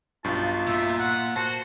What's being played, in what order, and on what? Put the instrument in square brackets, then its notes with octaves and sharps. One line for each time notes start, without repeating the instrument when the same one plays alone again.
[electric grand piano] B1 G2 [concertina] F4 [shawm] A5
[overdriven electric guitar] A#2 [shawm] E5
[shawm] F#5
[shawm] F#4 [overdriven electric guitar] C5 [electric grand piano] A5